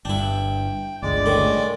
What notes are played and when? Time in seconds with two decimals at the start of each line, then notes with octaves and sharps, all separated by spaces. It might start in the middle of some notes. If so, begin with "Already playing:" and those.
0.05 G1 G2 D4 E4 G5
1.02 G1 C#2 D3 G#3 D5 D6
1.26 A2 D#3